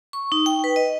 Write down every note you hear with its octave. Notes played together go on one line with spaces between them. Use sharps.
C#6
D#4
G5
B4
D#5